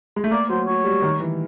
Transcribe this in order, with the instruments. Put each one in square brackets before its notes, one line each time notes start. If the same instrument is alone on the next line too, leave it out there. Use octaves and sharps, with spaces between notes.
[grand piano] G#3
A3
[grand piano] A#3 [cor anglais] D5
[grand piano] F#3 [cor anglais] C5
[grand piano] F#3 [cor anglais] C#5
[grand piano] G3
D#3
E3